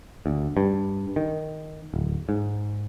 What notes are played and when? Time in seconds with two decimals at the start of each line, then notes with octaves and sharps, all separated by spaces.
0.26 D2
0.57 G2
1.16 D#3
1.94 D1
2.29 G#2